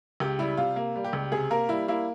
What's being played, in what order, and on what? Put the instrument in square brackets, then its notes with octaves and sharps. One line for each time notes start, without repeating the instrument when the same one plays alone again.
[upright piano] C#2 G4
G3 E4
C3 F4
A#3
G3
G4
C#2
C3 G#4
A#3 A#4
G3 E4
A#3 E4